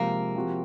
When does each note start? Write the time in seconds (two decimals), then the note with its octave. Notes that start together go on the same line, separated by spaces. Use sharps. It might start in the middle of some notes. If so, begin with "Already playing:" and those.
Already playing: C3 F3 G#3 A#3
0.35 C3 F3 C4 F#4